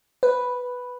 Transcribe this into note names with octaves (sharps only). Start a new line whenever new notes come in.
B4